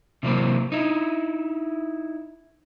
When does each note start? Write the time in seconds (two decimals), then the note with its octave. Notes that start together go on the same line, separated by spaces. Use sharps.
0.23 C3 E3 F#3 A#3 C4
0.72 D#4 E4